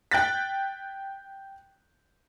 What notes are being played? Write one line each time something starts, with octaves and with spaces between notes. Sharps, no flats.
G5 F#6 A6 B6